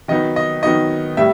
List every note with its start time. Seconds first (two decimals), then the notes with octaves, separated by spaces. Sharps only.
0.08 D#3 F#3 B3 D#4 D#5
0.36 D#5
0.63 D#3 F#3 B3 D#4 D#5
1.17 A2 G3 E5